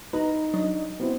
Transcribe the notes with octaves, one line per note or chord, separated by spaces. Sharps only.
D#4 B4 A#5
F#3 D4 D#5
B3 C4 E4